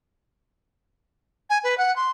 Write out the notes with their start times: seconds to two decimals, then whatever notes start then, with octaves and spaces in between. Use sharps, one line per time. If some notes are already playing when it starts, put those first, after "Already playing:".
1.49 G#5
1.63 B4
1.77 F#5
1.95 C6